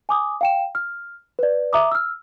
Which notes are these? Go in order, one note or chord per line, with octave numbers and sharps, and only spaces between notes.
G#5 D6 D#6
F5 G5 E7
F6
B4 D5
E5 A#5 D6 D#6
E6 F6